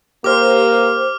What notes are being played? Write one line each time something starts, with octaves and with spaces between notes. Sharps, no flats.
A#3 G4 C5 D6 F6